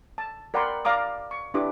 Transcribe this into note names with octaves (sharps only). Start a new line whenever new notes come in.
A5
A#4 D5 F#5 G5 B5 C6
D5 F5 A#5 D6 D#6
C#6
D4 E4 G4 B4 D6